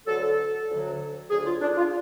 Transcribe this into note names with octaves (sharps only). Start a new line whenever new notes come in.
D2 D3 F#3 A4
A4
D2 D3 F#3
D2 D3 F#3 G#4
F4
D4
F4